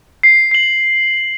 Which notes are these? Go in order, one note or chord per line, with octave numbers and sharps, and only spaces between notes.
C7
C7 F#7